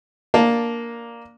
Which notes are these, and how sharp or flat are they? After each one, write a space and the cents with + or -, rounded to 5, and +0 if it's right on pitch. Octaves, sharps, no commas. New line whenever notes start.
A#3 +5 D4 +0 A5 +0